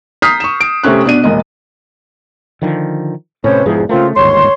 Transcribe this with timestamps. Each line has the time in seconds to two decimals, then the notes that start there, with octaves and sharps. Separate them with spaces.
0.22 A#5 D#6 F6 G6 B6 C7
0.40 C#6 E7
0.61 D7
0.83 C3 A3 C4 C#4 F#6
1.05 B2 D4 D#7
1.24 E1 A#2 D#5
2.62 D3 D#3 F3
3.44 A2 C3 C#4 B4 C5
3.66 E1 E2 G#2 F3 G#4
3.89 C#3 A3 A#3 C4 F4
4.16 G1 D#2 G#2 C#5 C6